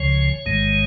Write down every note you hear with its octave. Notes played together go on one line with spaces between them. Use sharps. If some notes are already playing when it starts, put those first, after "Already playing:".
Already playing: C#2 C#3 F3 C#5
A1 G#2 D#3 G#3